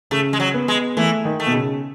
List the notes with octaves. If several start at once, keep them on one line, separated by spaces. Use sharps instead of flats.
C#3 A3
G#3
F#3
B3
G#3
E3 A3
D#3
A3
B2
C#3